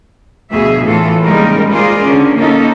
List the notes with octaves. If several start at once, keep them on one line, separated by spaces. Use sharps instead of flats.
D2 B2 F3 G#4 E5
A2 E3 F4 A4
D#2 C#3 G3 G#3 D#4 A#4
F4 G#4 A#4 C5 D5
D3 C#4
A#3 C#4 D#4 F4 A4